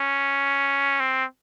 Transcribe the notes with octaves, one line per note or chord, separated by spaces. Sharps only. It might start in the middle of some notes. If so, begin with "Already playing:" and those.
Already playing: C#4
C4